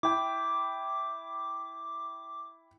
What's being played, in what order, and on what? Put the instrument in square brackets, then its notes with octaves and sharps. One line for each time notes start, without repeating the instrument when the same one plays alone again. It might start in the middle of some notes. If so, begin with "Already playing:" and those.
[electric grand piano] E4 G5 [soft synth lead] D6